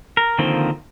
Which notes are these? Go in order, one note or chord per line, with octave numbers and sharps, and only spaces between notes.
A#4
D3 D#3 F3 A#3 C4